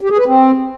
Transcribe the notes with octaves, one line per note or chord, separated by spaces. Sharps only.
G4
G#4
B4
C4